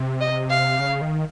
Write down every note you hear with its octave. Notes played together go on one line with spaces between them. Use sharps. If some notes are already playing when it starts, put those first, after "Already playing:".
Already playing: C3
D#5
F5
C#3
D#3